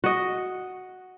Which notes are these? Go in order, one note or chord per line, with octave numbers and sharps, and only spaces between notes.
F#4 D#5